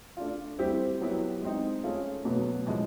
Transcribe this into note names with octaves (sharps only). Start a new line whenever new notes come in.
A3 D4 F4
G3 C4 E4 G4 C5
F#3 B3 E4 G4
G#3 C4 D#4
A3 C#4 F4 G#4
B2 F#3 B3
A2 F3 G#3